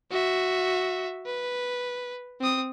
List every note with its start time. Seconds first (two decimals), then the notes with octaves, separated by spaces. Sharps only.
0.11 F#4 E5
1.26 B4
2.40 C4 D#6